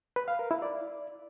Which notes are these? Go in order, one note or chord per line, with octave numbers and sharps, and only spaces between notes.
B4
F5
A#4
E4
D5